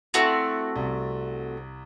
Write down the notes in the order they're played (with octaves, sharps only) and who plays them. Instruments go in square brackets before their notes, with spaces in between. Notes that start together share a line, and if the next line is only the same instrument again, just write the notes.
[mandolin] A3 C4 F#4 [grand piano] E4 A4 F#5
[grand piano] C2